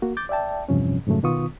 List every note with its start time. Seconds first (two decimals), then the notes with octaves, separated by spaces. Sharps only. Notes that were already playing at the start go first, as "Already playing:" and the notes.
0.02 A#3 F#4
0.17 D6 G6 A6
0.29 D5 E5 G5 A5
0.69 E2 G2 C3 F3 C#4
1.07 F2 G#2 C#3 F#3 A3
1.23 B2 D#3 B3 F4 C#6 D#6